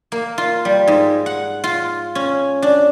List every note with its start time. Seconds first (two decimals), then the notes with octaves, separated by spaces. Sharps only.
0.12 A#3
0.38 F4
0.65 G3
0.87 G#2
1.26 F#5
1.64 F4
2.15 C#4
2.62 D4